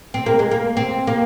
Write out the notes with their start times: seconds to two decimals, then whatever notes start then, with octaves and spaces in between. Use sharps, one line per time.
0.14 C4
0.26 A#3
0.39 G#3
0.51 A#3
0.77 C4
1.07 A#3